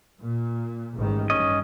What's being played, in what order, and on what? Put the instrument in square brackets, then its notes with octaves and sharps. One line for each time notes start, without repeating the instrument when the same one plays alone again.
[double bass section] A#2
A1 G#2 D#3
[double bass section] G2 [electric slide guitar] C#4 D#5